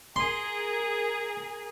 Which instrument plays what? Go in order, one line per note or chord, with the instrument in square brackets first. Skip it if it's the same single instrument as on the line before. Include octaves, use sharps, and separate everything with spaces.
[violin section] G#4 A#4 [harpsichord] C6